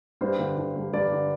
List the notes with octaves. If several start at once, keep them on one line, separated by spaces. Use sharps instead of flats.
G2 C5
D3
D3
G2
G2 D5
D3